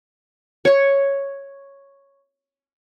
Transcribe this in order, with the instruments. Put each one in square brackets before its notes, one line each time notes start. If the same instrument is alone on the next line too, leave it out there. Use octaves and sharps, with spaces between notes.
[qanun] C#5 C#6